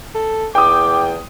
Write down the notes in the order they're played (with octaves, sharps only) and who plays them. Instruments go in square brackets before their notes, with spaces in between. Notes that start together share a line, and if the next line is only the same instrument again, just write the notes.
[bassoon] A4
[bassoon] E2 [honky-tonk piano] G5 D#6 [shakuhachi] D6